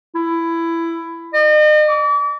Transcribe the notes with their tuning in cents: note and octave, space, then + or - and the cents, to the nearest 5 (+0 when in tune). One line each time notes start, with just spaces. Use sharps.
E4 +15
D#5 -40
D6 -40